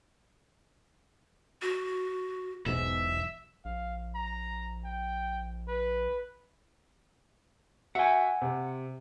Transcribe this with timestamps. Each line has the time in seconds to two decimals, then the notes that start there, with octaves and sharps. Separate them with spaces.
1.62 F#4
2.66 E1 B1 G#2 E5
3.65 A#1 F5
4.15 A#5
4.84 G5
5.68 B4
7.95 F#4 E5 F#5 G#5
8.41 C3